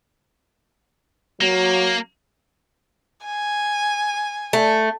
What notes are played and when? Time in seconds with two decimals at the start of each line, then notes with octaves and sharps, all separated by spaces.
1.41 F#3 A#3
3.25 G#5
4.53 A3